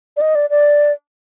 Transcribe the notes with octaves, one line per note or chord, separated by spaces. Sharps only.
D5
D#5
D5
D5